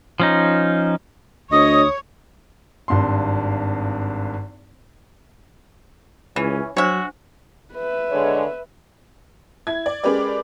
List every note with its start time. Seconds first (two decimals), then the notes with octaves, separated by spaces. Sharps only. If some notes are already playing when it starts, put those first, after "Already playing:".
0.20 F3 C#4 D#4
1.52 D2 C#5 D#5 D#6
2.88 G#1 G2 C6
6.36 C#2 E3 C#4
6.77 F#3 D4 F#4 C5 C#5 E5
7.74 B4 E5
8.11 D3 G#3 C#5
9.67 E4 G#6
9.86 D5
10.04 G#3 C#4 G4 A#4 B4 D5